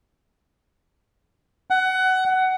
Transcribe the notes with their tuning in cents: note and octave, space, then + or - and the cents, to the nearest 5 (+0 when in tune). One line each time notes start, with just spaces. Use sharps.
F#5 +20